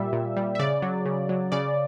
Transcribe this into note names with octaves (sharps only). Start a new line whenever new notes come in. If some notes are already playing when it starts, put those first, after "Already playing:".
Already playing: A#2 G3 E5
A#2
G3
E5
C#3 D5
F#3
C#3
F#3
C#3 D5